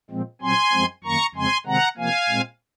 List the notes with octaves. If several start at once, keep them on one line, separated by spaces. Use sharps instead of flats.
A#2 F3 G#3 C4
A#2 F#3 C4 G#5 C6
F#2 F3 G#3 C4
F#2 D#3 A#3 A#5 C#6
F2 C#3 G#3 C4 G#5 C6
C3 D#3 G#3 C4 F#5 A#5
C3 F3 A#3 F5 G#5
A#2 G#3 C4